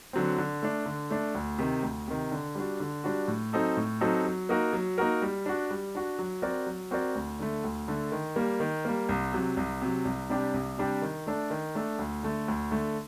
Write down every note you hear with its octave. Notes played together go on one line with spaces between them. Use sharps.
D3 F#3 C4
D3
A3 D4
D3
A3 D4
D2
C3 D#3
D2
C3 D#3
D3
G3 D4 F#4
D3
G3 D4 F#4
A2
F#3 C4 D#4 A4
A2
F#3 C4 D#4 A4
F#3
A#3 D#4 F#4 A#4
F#3
A#3 D#4 F#4 A#4
G3
D4 F#4
G3
D4 F#4
F#3
C4 F#4 A#4 D5
F#3
C4 F#4 A#4 D5
D2
D3 A3
D2
D3 A3
D#3
G3 A#3
D#3
G3 A#3
C2
C3 F#3
C2
C3 F#3
C2
C3 G3 D4 G4
C2
C3 G3 D4 G4
D#3
A3 D4 A4
D#3
A3 D4 A4
D2
D3 A3
D2
D3 A3